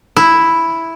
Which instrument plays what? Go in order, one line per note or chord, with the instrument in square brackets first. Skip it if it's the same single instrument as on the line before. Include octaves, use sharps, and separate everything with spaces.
[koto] E4